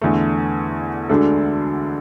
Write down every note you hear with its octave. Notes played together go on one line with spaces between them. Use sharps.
E2 D3 A3
D2 D3 G#3 D4 A4